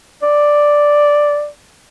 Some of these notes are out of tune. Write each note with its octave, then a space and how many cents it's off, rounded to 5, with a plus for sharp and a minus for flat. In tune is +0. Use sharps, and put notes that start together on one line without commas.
D5 +0